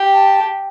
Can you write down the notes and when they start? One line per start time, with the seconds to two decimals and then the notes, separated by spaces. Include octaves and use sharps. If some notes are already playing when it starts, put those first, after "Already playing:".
Already playing: G4
0.13 A5